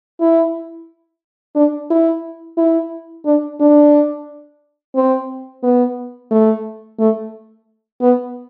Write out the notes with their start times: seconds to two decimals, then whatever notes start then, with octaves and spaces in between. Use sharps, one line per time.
0.21 E4
1.55 D4
1.90 E4
2.57 E4
3.26 D4
3.60 D4
4.96 C4
5.63 B3
6.31 A3
6.99 A3
8.01 B3